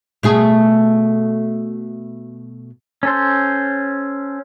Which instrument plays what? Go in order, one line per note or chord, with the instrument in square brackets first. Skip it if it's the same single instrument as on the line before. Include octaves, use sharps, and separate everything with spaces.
[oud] B2 A3 G#4
[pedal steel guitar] C#4 A4 C5